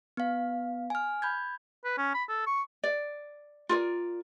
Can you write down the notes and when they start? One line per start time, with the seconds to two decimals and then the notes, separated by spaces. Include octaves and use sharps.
0.17 B3 F5
0.90 G#5 F6
1.22 B5 G6 G#6
1.85 B4
1.98 C#4
2.15 B5
2.29 A4
2.47 C#6
2.84 D5
3.69 F4 A#4 D5